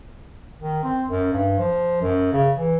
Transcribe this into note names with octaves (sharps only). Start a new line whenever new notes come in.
D#3
C4
F#2
G2
F3
F#2
C#3
E3